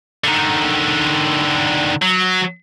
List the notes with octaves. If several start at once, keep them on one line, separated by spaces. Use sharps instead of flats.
D3 D#3
F#3